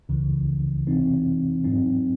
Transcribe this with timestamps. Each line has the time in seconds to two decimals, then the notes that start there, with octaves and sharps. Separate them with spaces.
0.09 C#2 C#3 E3
0.87 C3 E3 C4 D#4
1.64 G#2 F#3 C4 D#4